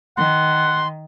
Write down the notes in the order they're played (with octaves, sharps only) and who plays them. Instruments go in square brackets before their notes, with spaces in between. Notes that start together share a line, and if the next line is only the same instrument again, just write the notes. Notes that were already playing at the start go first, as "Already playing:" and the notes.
[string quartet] D#3 [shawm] F#5 [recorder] C6